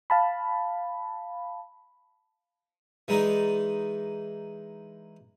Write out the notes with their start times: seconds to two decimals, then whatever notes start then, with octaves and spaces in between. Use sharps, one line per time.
0.10 F5 A5 B5
3.08 E3 G#3 D#4 D5